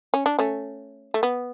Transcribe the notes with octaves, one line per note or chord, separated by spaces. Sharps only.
C#4
D4
A3 C#4
A3
B3